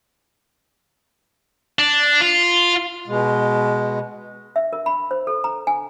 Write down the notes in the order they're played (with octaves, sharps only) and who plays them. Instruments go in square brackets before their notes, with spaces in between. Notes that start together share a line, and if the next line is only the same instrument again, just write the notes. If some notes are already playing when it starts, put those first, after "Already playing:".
[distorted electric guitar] D4
F4
[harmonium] B2 G#3
[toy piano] E5
A#4
B5
C5
A4
A#5
G#5